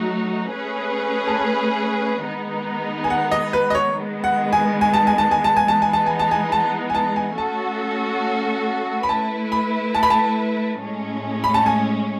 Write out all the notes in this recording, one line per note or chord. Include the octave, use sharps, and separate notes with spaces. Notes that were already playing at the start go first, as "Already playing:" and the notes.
Already playing: F#3 A3 D#4 F#4
A3 C#4 G#4 B4
A5
G#5
D#3 G#3 B3 D#4
G#5
F#5
D#5
B4
D#5
C#5
D#3 G#3 B3
F#5
G#5
G#5
A5
G#5
A5
G#5
A5
G#5
E3 G#3 B3 D#4 A5
G#5
A5
G#5
A5
G#5
A5
G#5
A5
G#5
A3 C#4 F#4 A4 A5
B5
A3 E4 B4 A5
B5
A5
B5
A5
A2 G#3 C#4
B5
A5
G#5